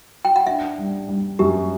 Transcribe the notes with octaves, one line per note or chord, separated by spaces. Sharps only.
G5
F#5
D4 E5
G3
G3
F#2 G4